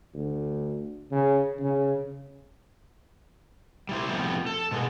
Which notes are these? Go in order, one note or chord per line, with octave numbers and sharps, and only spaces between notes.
D2
C#3
C#3
G3 E4 C5
F2 A2 C3 F3 B3 C4
A4
B2 G#3 B3